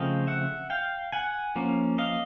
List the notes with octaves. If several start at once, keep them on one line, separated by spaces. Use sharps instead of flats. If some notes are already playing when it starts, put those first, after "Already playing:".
Already playing: C#3 F3 A3 C4 D#5 F5
E5 F#5
F5 G5
F#5 G#5
F3 A#3 C#4
D#5 F5